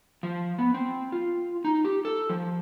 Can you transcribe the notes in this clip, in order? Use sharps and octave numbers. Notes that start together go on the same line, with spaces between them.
F3
B3
C4
F4
D#4
G4
A4
F3